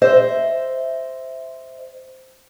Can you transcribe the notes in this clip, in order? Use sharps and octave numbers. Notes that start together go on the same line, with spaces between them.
C5 D#5 E5